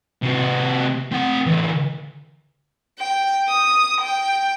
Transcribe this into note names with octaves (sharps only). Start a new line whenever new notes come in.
C3 F#4
C4 F#5
D3 E3
G5
D#6
G5